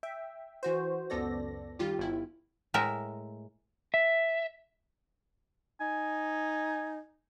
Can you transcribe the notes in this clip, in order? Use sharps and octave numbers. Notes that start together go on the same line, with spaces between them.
E5 G5
E3 F#4 C5
C#2 F#2 B3 A4 D5 A#6
D#3 G3 F4 G4
G1 D#3 E4
A2 G#3 A#4 E5 A5 A#5
E5
D#4 G#5